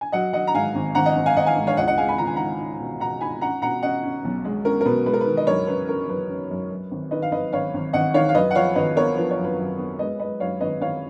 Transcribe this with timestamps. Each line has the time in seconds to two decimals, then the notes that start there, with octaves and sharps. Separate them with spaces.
0.01 G#5
0.12 F#3 D#5 F#5
0.33 F#3 D#5 F#5
0.47 A#5
0.54 G#2 F5 G#5
0.75 G#1
0.95 G#1 F#5 A#5
1.05 D#5 F#5
1.16 G#1
1.26 F5 G#5
1.36 G#1 D#5 F#5
1.46 F5 G#5
1.57 G#2
1.67 C#5 F5
1.77 C#2 D#5 F#5
1.87 D#5 F#5
1.98 G#3 F5 G#5
2.08 G#5 B5
2.18 C#2 A#5
2.27 G#5
2.36 D#4 F#5 A#5
2.60 D#4
2.80 B2
3.00 B2 F#5 A#5
3.21 D#4 G#5 B5
3.41 C#4 F#5 A#5
3.62 B2 F#5 A#5
3.83 C#4 D#5 F#5
4.03 C#4
4.24 B1
4.45 G#3
4.65 C#4 A#4
4.81 A#4
4.85 B2 B4
5.06 G#3 B4
5.13 A#4
5.21 B4
5.26 D#3
5.37 D#5
5.47 F#2 A#4 C#5
5.67 C#4 B4
5.88 C#4 A#4
6.08 F#2 B4
6.29 C#4
6.51 F#2
6.70 F#2
6.91 G#1
7.11 D#3 B4 D#5
7.22 F5
7.32 G#1 B4 D#5
7.53 G#1 C#5 F5
7.74 G#1
7.93 G#1 D#5 F#5
8.14 D#3 C#5 F5
8.29 F5
8.35 F#2 B4 D#5
8.51 F#5
8.55 F3 C#5 F5
8.75 G#1 B4 D#5
8.96 B3 A#4 C#5
9.17 F3 B4
9.31 C#5
9.38 F#2
9.44 B4
9.59 F#2
9.78 B3
9.99 G#3 B4 D#5
10.19 G#3 B4 D#5
10.40 F#2 C#5 F5
10.60 G#1 B4 D#5
10.81 G#1 C#5 F5